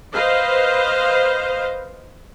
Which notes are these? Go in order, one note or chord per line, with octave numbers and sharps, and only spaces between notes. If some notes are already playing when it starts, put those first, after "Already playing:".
B4 C5 D#5 F5